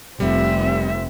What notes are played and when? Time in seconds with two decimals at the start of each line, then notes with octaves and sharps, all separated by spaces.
0.20 F1 F2 G3 C4 E5